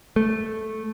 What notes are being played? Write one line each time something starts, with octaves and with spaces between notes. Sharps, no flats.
A3